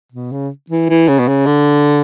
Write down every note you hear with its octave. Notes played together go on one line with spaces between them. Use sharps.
B2
C#3
E3
E3
C#3
B2
C#3
D3